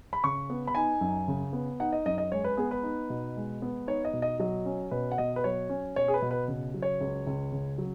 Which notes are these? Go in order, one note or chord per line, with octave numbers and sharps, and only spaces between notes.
B5
C#3 C#6
B3
B5
D#4 G#5
F#2
C#3
B3
D#4 F#5
D#5
F#2 D#5
D#5
G#3 C#5
B4
B3 G#4
B4
D#4
B2
G#3
B3
D#4 C#5
D#5
B2
D#5
F#3 D#5
C#4
B2 B4
F#5
B2 D#5
B4
F#3 C#5
C#4
B2 C#5
G#4
B4
B2
B4
C#3
F#3
C#5
C#2
C#2
C#3
F#3